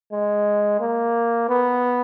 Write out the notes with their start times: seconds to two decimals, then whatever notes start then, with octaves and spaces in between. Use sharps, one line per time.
0.12 G#3
0.80 A#3
1.49 B3